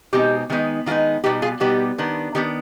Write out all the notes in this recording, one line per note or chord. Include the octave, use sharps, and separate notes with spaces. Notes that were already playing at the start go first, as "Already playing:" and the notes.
B2 G#3 C4 D#4 G4
D#3 G#3 B3 D#4
D#3 G#3 B3 D#4 F4
B2 G3 B3 D#4 G4
F4 G#4
B2 G3 B3 D#4 G4
D#3 B3 D4
D#3 B3 D4 G4